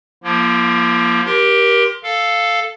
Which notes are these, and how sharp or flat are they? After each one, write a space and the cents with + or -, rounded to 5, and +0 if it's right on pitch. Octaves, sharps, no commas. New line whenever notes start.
F3 +10 A#3 +25 F4 -45
G4 +0 A#4 +25 C6 +0
A4 +0 F5 +0